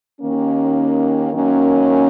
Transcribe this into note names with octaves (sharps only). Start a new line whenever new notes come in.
D#2 D#3 A#3 C#4
F#2 D#3 A#3 C#4